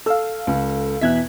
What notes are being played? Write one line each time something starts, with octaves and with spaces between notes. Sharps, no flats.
A4 F5 E6
C#2
E2 B2 E5 F#6 G#6 B6